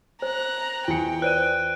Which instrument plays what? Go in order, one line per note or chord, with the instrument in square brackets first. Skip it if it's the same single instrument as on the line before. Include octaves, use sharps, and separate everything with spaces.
[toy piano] C5 [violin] A#5 F#6
[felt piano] E2 C#7 [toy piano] F4 [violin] G5
[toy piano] B4 C5 D5 [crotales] F#6 D7 D#7